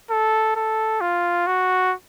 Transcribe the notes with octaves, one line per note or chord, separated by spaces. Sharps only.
A4
A4
F4
F#4